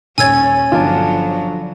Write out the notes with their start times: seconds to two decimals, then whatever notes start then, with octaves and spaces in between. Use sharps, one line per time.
0.18 D#1 C#4 C#5 G#5 E6 G#6 A6
0.72 G1 D3 F3 F#3 D4 F4